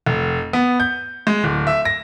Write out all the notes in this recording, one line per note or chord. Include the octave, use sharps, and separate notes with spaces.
F1
B3
G6
G#3
D1
E5
A#6